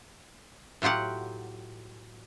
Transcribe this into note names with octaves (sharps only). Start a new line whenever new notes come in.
A2 F#3 F4 G4 F#5